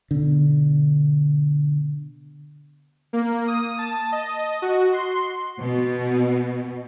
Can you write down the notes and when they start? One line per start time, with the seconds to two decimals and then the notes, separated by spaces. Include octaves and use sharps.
0.11 B2 D3
3.13 A#3
3.48 D#6
3.78 A5
4.12 D#5
4.62 F#4
4.93 C6
5.60 B2